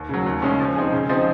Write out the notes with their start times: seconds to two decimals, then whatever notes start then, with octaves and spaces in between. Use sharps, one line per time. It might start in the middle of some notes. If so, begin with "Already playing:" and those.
Already playing: D#2
0.09 C#3 F#3
0.26 D#2
0.42 C#3 G#3 C#4
0.60 F3
0.75 C4 D#4 G#4
0.92 C#3
1.09 F3 C4 D#4 G#4